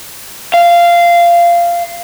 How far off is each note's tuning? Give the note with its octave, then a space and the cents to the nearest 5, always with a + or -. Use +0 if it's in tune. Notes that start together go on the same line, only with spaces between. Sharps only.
F5 -15